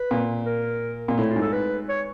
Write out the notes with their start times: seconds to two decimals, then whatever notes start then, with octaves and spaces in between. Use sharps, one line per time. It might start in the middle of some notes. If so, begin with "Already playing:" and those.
Already playing: B4
0.11 A#2
0.46 A#4
1.08 A#2
1.18 A2 E4
1.30 F4
1.36 G#2
1.42 A4
1.53 B4
1.89 C#5